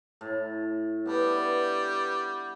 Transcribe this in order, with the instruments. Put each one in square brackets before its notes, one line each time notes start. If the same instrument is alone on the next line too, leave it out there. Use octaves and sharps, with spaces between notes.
[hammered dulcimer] A2
[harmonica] G3 [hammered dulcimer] B3 D4